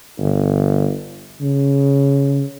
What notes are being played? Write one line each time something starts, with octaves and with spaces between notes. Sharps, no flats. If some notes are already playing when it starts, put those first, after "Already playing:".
G1
C#3